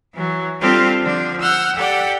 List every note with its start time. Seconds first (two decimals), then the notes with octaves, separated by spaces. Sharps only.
0.13 E3 F#3
0.61 G3 C4 D4 F4 G4 A4
1.02 D3 F3 D4
1.41 F#5 E6 F6 G6
1.76 G4 A4 D5 F#5 G5